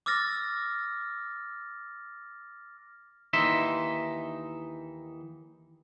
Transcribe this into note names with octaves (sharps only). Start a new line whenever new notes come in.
D6 E6 F6 A6 A#6
D#2 E3 D#4 E5 C6